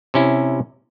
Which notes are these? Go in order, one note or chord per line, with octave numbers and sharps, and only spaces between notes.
C3 C#4 E4